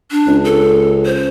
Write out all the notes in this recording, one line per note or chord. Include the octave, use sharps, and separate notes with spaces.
D4
C#2
A4
C5